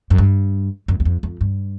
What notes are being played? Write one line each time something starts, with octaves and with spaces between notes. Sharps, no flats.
F#2
G2
F#2
E2
F2
F2
G2